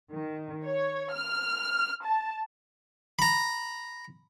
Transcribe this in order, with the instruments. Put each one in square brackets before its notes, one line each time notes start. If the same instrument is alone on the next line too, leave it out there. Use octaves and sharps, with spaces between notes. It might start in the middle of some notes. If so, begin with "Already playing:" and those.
[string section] D#3
C#5
F6
A5
[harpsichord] A#5 B5